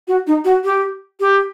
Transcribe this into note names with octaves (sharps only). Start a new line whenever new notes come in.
F#4
D#4
F#4
G4
G4